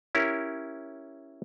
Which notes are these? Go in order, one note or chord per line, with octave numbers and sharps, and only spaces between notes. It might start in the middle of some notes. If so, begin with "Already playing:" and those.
C#4 E4 G4 A#4